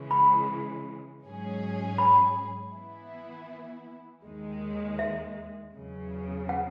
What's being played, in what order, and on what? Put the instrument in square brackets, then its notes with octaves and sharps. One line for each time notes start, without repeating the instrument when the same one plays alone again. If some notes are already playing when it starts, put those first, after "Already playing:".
Already playing: [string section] C#3 E3 G#3
[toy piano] B5
[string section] G#2 F#3 C#4 G#4
[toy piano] B5
[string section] E3 B3 E4
D#2 D#3 G#3
[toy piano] E5
[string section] E2 C#3 F#3
[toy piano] F#5